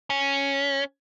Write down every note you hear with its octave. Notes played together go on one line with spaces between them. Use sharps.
C#4